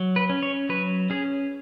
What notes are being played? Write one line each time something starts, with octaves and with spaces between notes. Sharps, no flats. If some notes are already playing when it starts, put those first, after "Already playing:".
Already playing: F#3
B4
C#4
C#5
F#3 B4
C#4 G#4